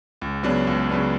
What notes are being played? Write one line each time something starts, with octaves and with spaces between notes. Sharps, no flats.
C#2
C#3 F#3 B3 D4
C#2
C#3 F#3 B3 D4